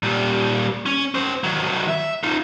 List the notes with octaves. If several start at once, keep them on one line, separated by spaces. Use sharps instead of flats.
A#2 G3
C#4
C#4 C5
D#3 F#3
E5
D#4 F4